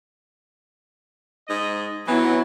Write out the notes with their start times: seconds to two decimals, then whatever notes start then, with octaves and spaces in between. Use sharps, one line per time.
1.48 G#2 D#5
2.07 E3 F#3 B3 E4